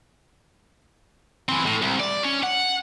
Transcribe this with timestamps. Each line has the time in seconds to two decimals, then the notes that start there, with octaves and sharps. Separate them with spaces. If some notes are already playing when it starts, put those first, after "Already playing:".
1.49 E3 C4
1.66 A2
1.82 C2
2.00 D5
2.23 C#4
2.43 F#5